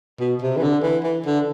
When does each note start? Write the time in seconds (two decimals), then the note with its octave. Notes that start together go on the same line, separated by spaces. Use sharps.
0.20 B2
0.42 C3
0.57 E3
0.63 D3
0.83 E3
1.04 E3
1.25 D3